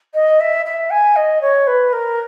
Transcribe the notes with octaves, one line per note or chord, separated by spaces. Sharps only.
D#5
E5
E5
G#5
D#5
C#5
B4
A#4